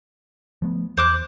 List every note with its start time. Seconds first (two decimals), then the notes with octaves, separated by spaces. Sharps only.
0.62 F3 A3 B3
0.97 E2 C5 D6 F#6